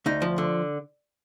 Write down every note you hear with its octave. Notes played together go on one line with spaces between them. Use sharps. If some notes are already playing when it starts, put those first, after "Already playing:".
D2 D#4
F3
D3